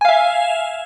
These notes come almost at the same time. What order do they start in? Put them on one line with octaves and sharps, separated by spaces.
G#5 F5 E5